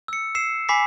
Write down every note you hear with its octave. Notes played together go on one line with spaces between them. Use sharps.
E6 C#7
E6 C7 E7
G#5 B5 D6 B6 C7